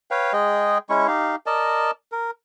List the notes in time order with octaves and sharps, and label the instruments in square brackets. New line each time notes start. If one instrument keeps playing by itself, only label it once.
[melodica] B4 C#5 F5 G5
G#3 G#4 D#5 G5
G#3 C#4 E4 C#6
D#4 G4 F5
A#4 D5 D#5 A5
A#4